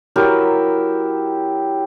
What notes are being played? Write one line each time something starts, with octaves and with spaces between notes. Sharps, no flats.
F#3 E4 G4 A#4